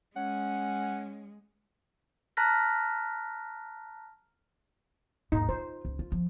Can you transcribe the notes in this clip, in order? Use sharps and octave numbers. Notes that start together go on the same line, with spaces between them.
G#3 C#4 F#5
A5 A#5 F6 F#6 A#6 B6
D#2 G#2 D#4
F4 C5
C#2
F4
F3